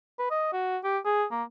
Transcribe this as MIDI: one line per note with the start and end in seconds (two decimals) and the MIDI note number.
0.19 0.30 71
0.31 0.50 75
0.53 0.78 66
0.84 0.98 67
1.05 1.24 68
1.31 1.43 58